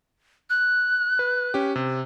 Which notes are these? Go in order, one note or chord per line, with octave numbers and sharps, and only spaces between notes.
F#6
B4
C#4 G4
C3